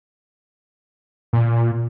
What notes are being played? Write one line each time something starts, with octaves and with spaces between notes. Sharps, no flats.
A#2